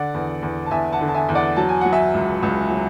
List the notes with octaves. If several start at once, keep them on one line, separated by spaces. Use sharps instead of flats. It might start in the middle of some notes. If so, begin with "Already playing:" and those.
Already playing: D3 D5 F#5
E2
E2
A5
E2 E5 G#5
F#5 A5
D3
A5
E5 G#5
E2
D5 F#5
F#3 A5
G#5
F#3 F#5
E5 G#5
C#2
C#2
F#3